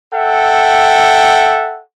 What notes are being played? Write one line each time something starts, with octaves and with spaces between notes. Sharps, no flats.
A4 E5 F#5 G5